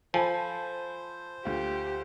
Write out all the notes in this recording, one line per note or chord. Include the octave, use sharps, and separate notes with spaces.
F3 A4 C5 G#5 B5
D2 F4 G4